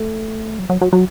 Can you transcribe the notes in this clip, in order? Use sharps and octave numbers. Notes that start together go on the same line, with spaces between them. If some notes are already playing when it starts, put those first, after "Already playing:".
Already playing: A3
F#3
F#3
F#3
F#3